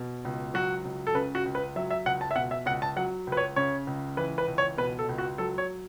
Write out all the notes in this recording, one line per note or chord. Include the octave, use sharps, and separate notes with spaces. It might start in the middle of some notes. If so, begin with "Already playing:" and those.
Already playing: B2
C#2
F#3 F#4
C#2
A4
C#3 B4
F#4
C#2
B4
F#3 E5
E5
C#2 F#5
A5
E5
B2 F#5
E5
C#2 F#5
A5
F#3 F#5
C#2
B4
C#5
C#3 C#5
C#2
E3 B4
B4
C#2
C#5
B2 B4
A4
C#2
F#4
F#3 A4
C#5